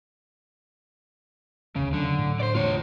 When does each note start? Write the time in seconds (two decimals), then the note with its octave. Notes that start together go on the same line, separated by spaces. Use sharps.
1.76 E1 D2 C#3
1.93 D3 F#3
2.18 A2
2.40 C5 D5
2.55 E1 A3 C4 F4 C#5